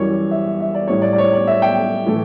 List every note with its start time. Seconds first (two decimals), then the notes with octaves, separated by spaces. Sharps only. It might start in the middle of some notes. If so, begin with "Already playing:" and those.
Already playing: F#2 E3 G3 C#5
0.31 E5
0.60 E5
0.75 D5
0.88 A2 G3 C#5
1.02 D5
1.13 D5
1.18 C#5
1.33 D5
1.47 E5
1.62 G5
2.07 A2 E3 A3